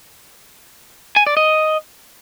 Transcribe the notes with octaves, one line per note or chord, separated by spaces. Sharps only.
G#5
D5
D#5